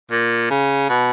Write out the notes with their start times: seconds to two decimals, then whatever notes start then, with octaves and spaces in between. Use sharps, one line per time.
0.11 A#2
0.50 C#3
0.89 B2